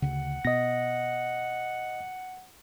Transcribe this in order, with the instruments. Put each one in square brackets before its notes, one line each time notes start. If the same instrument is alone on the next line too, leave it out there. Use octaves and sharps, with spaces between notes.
[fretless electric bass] D2 C#3 [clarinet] F#5
[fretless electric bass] B2 B3 [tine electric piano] D#5 A#6